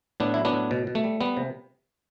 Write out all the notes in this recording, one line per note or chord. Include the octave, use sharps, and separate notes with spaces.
A2 B3 D4
F#3 E4
B3 D4
A2
B2
B2
A3
G3
G3 B3
C3